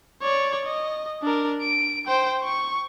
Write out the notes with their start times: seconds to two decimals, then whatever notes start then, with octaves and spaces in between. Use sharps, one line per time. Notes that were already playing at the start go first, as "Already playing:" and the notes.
0.22 C#5 D5
0.65 D#5
1.22 D4 A#4
1.62 D7
2.07 C5 G5
2.44 C#6